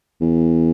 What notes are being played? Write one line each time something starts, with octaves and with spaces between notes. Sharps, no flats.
E2